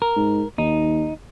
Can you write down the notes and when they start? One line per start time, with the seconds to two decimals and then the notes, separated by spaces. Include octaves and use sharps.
0.02 A#4
0.16 G#2
0.58 D#2 D#4